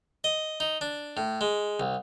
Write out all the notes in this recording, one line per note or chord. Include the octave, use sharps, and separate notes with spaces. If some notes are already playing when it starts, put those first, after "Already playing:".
D#5
D#4
D4
A2
G#3
C2